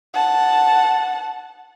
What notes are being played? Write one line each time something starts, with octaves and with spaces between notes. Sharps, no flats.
F#5 A5